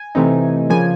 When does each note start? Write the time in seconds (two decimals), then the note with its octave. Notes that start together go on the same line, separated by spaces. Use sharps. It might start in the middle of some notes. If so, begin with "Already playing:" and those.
Already playing: G#5
0.15 C3 E3 A3 C4 D#4
0.70 C#3 F3 A#3 G#5